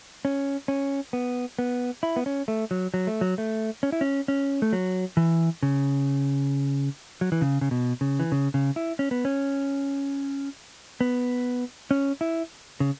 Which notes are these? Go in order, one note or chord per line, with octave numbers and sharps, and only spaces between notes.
C#4
C#4
B3
B3
E4
B3
C#4
A3
F#3
F#3
A3
F#3
A3
C#4
E4
C#4
C#4
A3
F#3
E3
C#3
F#3
E3
C#3
C#3
B2
C#3
E3
C#3
C#3
E4
C#4
B3
C#4
B3
C#4
E4
C#3